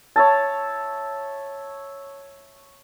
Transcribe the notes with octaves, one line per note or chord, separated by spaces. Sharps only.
C#5 E5 A5